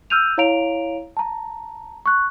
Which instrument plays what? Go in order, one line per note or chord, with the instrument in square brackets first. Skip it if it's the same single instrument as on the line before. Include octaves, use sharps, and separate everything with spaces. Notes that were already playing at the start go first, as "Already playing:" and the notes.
[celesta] E6 F6 G6 D#7 F7
E4 C#5 F5 A#5 D7 F7
A5 A#5
C#6 F#6